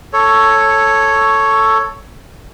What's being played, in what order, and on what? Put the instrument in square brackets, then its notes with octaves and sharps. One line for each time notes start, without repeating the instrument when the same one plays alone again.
[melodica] A4 C#5